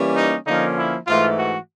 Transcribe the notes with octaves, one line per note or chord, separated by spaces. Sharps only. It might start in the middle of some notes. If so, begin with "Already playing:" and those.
Already playing: E3 G3 A#3 C#4
D#4
D3 F3 A#3 C#4 D#4
E4
G#2 E3 A3 F4
F#4